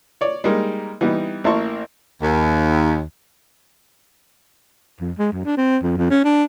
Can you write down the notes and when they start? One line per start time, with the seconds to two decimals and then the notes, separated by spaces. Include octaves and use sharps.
0.21 C#5 D5
0.44 G3 G#3 A#3 D#4 A#4
1.01 E3 G3 B3 D#4
1.44 A1 A#3 E4 A5 C6 C#6
2.22 D#2
5.01 F2
5.18 G#3
5.32 F#2
5.45 D4
5.57 C4
5.83 F2
5.97 F2
6.10 C#4
6.24 D4